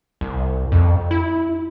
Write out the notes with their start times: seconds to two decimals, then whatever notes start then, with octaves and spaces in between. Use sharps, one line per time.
0.21 C2
0.72 F2
1.11 E4